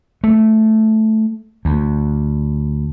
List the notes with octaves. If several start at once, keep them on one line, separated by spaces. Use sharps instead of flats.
A3
D2